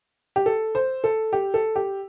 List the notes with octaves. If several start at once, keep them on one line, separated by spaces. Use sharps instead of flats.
G4
A4
C5
A4
G4
A4
G4